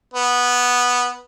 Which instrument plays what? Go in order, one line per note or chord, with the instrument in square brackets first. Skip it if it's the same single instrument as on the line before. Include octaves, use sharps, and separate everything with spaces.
[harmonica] B3